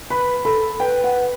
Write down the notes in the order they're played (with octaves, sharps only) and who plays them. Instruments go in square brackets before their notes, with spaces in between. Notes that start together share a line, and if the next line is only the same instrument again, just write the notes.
[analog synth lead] B4 [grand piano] B5
[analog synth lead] A4 [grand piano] B5
[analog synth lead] B4 [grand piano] G5
[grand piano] F#5